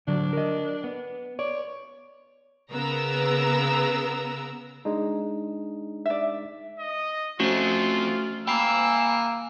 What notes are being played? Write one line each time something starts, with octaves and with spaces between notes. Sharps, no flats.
D3 F#3 D4
A#4 D#5
B3
C#5 D5
C#3 B3 A#4 B4 A#5 E6
G#3 D4 D#4
D5 E5
D#5
F3 A3 C4 C#4 F4 F#4
A#3 G5 G#5 B5 E6 C7